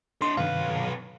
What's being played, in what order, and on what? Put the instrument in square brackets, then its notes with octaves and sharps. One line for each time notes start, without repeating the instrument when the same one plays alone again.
[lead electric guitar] D4 D#5 [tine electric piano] C6
[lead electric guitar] B1 B4 [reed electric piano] G2 C3 D#3 [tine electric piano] F5